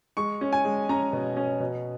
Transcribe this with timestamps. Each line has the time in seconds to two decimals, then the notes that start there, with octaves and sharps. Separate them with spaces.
0.17 G#3 C#6
0.41 C#4
0.52 G#5
0.65 G#3
0.89 C#4 A#5
1.13 B2
1.37 C#4
1.60 B2